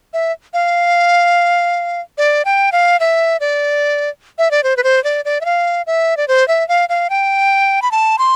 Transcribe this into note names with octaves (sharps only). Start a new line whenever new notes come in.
E5
F5
D5
G5
F5
E5
D5
E5
D5
C5
B4
C5
D5
D5
E5
F5
E5
D5
C5
E5
F5
F5
G5
B5
A5
C6